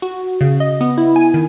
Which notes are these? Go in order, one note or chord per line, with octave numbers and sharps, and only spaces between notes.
F#4
C#3
D#5
B3
E4
G#5
D#3